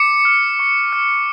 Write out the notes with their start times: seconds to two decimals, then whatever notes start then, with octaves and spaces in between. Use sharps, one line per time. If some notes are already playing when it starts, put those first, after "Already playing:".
Already playing: D6 C#7
0.25 F6
0.59 C#6
0.93 F6